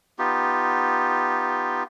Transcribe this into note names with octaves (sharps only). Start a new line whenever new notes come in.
B3 D#4 F4 G4